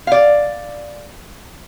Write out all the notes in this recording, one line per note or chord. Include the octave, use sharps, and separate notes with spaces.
D5 F5